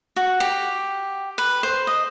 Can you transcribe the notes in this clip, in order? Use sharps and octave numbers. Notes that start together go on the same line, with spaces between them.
F#4
G4
B4
C5
D#5